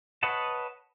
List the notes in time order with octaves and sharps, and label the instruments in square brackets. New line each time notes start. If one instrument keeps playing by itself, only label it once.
[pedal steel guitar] B4 C#5 D#5 F#5 A5